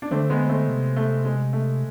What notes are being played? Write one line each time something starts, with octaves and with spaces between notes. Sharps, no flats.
D4
D3 A3 C4
G#3 B3
A3 C4
C3
A3
G#3
A3